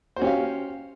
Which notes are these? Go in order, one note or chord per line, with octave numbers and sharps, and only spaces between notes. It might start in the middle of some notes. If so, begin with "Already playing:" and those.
C#4 F#4 G4 C5 F5